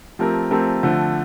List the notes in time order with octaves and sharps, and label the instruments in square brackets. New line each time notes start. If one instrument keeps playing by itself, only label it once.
[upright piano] F3 A3 C4 G4 A#4
F3 A3 C4 G4 A#4
D3 F3 A3